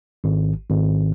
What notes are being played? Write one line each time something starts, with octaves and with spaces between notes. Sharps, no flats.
G#1
G#1